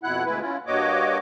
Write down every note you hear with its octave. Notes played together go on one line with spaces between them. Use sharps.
F2 B2 E4 F#5 F#6
D2 B2 G#3 E4 B4
C#4 E4 F4
G2 A#3 F#4 C#5 D#5 D6